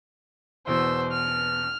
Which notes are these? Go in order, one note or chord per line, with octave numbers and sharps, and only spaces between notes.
E2 B2 C5 E6
F6